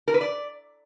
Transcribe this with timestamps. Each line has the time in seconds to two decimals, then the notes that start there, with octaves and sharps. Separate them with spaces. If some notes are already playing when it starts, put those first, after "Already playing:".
0.08 A#4
0.14 B4
0.21 D5